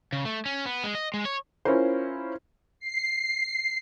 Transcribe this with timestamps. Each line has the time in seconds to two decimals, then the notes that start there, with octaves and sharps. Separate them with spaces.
0.13 C#3
0.25 A3
0.46 C#4
0.66 B3
0.84 G#3
0.95 D#5
1.14 G#3
1.25 C#5
1.65 C#4 E4 F4 A#4 C5
2.80 C7